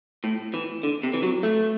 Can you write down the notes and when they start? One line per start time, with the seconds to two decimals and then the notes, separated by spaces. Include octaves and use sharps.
0.24 A2
0.54 E3
0.83 D3
1.03 C3
1.13 E3
1.23 F#3
1.43 A3